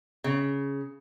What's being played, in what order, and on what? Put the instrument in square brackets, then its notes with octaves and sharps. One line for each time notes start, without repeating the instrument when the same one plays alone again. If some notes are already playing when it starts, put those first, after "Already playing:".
[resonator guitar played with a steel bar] C#3